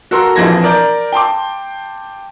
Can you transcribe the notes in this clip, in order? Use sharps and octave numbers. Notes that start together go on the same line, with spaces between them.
F#4 A4 A#4 C6 E6
A#1 F2 E3 G#6 A#6
A#4 D5 G6
G5 A5 C6 D6